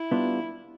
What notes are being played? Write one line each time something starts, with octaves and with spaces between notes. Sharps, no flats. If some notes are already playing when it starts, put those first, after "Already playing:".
Already playing: E4
G3 B3 D4 F4